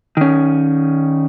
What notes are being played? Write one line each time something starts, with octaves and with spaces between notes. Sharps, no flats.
D#3 C#4